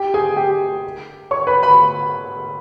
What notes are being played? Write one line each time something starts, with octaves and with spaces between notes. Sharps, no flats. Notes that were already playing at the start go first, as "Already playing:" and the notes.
Already playing: G4 G5
G#4 G#5
G4 G5
C#5 C#6
B4 B5
B4 B5